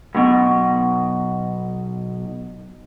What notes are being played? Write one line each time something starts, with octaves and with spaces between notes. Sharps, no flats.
B1 B2